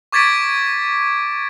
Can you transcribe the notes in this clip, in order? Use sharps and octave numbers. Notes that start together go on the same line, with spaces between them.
C#6 D6 G#6 A6 B6 D7